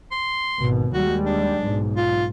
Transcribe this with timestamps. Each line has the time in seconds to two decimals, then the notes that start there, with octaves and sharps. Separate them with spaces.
0.12 C6
0.59 G#1 B2
0.94 D#2 G3 G#3 F#4
1.26 D4
1.63 B1 G#2
1.96 F4